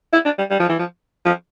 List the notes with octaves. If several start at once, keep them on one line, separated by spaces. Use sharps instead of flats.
E4
D4
G3
G3
F3
E3
F3
F3